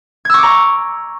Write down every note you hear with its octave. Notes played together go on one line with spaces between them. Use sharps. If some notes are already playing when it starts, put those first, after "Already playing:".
A#5 C#6 D6 E6 G#6